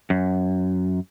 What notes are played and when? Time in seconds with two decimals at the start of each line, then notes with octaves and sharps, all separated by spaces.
0.10 F#2